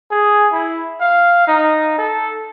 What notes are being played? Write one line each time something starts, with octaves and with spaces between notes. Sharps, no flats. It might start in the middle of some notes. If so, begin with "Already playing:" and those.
G#4
E4
F5
D#4
A4